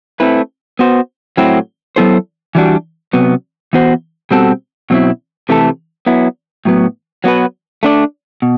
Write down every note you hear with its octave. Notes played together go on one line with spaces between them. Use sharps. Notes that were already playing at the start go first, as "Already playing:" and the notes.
A3 C4 E4 B4
B3 F#4 C5
A2 F#3 C4 E4
F#3 B3 E4 A4 C5
E3 G3 D4 F#4
C3 F#3 B3
E3 B3 F#4 C5
B2 G3 C4 F#4 A4
B2 F#3 C4 E4
C3 E3 A3 E4 A4
F#3 B3 E4
A2 F#3 B3
F#3 B3 F#4 B4
A3 D4 A4 D5
B2